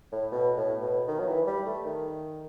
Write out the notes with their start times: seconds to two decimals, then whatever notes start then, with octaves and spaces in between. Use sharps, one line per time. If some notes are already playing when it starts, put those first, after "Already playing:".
0.12 A2
0.32 B2
0.57 A2
0.82 B2
1.07 D#3
1.19 F#3
1.27 E3
1.47 G3
1.66 A3
1.85 D#3